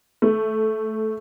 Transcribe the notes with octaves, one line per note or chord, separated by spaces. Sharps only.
A3